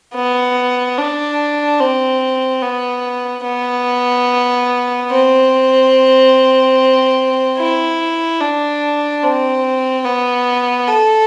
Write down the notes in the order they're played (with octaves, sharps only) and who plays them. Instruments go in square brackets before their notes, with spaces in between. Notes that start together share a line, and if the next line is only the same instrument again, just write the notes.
[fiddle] B3
D4
C4
B3
B3
C4
E4
D4
C4
B3
A4